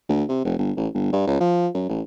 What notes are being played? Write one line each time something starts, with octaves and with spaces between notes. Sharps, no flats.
D2
C3
F1
G1
A1
G1
G2
C#2
F3
F#2
A1